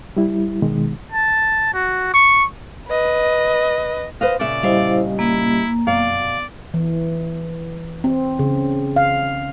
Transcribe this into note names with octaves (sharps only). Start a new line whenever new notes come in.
G3 E4
B2 D#3 G#3
A5
F#4
C#6
B4 D#5
B4 C5 D#5 F5
A#2 C#3 D5 E5
G3 E4 G4 C5 D#5 F5
A#3 E4
F#2 B2 D5 F5
E3
C4
C#3
F5